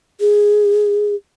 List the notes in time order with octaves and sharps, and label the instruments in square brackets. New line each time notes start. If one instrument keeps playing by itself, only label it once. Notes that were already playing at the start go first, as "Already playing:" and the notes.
[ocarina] G#4